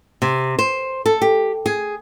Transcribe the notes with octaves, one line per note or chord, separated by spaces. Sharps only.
C3
C5
A4
G4
G#4